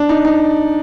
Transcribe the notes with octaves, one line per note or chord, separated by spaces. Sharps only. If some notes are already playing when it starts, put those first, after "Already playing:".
Already playing: D4
D#4
D#4